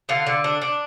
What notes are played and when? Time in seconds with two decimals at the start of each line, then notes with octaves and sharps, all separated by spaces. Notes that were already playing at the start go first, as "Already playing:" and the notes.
0.09 D3 F4
0.27 D3
0.44 D4
0.62 D4